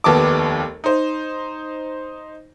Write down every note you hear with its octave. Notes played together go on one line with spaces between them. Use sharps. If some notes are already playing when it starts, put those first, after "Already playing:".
F1 D#2 B3 A5 D6
D#4 C5